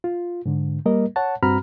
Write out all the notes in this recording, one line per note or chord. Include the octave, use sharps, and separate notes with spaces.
F4
G#2 D3
G3 A#3 A#4 D#5
C#5 F#5 A5
G2 C4 F#4 A#5 B5 F6